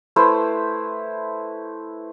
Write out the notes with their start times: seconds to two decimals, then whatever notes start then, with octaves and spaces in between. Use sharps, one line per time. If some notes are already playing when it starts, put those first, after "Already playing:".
0.16 A3 E4 B4 C5